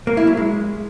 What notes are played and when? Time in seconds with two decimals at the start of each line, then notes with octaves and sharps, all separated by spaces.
0.07 A#3
0.17 E4
0.27 F#3
0.37 G#3